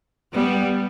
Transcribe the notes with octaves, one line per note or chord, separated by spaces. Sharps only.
G3 B3